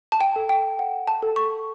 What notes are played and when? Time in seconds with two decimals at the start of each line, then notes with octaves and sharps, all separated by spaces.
0.12 A5
0.21 G5
0.36 A4
0.49 G5
0.79 F#5
1.07 A5
1.22 A4
1.36 C#6